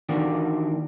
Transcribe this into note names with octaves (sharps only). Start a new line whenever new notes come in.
D#3 E3 A#3 D4 F#4 D5